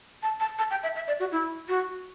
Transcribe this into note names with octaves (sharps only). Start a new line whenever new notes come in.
A5
A5
A5
G5
E5
E5
D5
F#4
E4
F#4